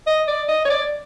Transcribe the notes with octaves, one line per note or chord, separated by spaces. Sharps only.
D#5
D5
D#5
C#5
D5